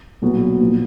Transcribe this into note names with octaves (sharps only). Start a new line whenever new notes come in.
B1 A#2 F#3 B3 F#4
A#2 F3 B3